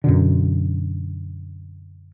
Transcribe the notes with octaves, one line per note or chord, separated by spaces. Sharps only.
F#2 B2 D3